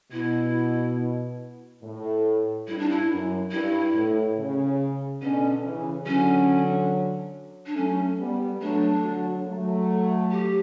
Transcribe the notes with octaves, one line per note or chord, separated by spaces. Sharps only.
B2 E4
A2
G2 E4
D4
E4
F#2
G2 E4
A2
C#3
B2 D3 C#4
C#3 E3
D3 F#3 C#4
D4
F#3 A3 C#4
G3 B3
F#3 A3 D4
D3 F#3
F#3 A3
G4